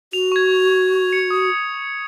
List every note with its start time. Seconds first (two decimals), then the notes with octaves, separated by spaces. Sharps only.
0.13 F#4 F7
0.32 C#6 G#6
1.13 C#7
1.31 D#6